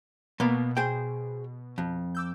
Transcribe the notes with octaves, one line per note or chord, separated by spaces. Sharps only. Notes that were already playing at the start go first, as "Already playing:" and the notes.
B2 A#3 B3
G#4 C5 G5
F2
D6 E6 G6